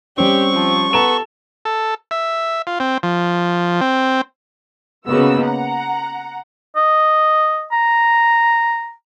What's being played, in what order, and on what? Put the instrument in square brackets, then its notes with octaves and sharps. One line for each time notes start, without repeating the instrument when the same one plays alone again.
[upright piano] G3 C#4 [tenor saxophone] C4 [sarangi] G4 [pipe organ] C#6
[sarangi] F3
[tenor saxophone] B3 [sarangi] A4 [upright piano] A#5 E7
[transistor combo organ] A4
E5
F4
C4
F3
C4
[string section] C#3 A#3 B3 D#4 F#4 E6
F#5 A#5
[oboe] D#5
A#5